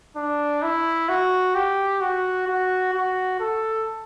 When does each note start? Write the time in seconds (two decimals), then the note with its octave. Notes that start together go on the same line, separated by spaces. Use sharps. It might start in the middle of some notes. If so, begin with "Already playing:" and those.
0.16 D4
0.62 E4
1.09 F#4
1.55 G4
2.01 F#4
2.48 F#4
2.94 F#4
3.40 A4